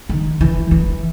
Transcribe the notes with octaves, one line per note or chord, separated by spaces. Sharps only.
D#3
E3
E3